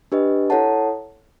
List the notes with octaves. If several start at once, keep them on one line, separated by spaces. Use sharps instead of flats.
D4 G4 B4 D#5
E4 A4 C#5 F#5 A5